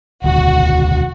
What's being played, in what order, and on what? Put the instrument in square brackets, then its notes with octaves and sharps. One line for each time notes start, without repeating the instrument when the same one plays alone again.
[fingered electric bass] E1 D2 [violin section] F#4